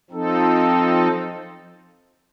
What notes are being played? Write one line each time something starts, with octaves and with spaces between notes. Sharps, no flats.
F3 C4 D#4 A4